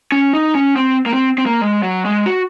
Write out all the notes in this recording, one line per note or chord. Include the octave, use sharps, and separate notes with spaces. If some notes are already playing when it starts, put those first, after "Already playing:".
C#4
D#4
C#4
C4
A#3
C4
C4
A#3
G#3
F#3
G#3
F#4